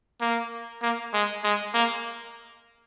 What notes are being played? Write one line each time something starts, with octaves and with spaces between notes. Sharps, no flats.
A#3
A#3
G#3
G#3
A#3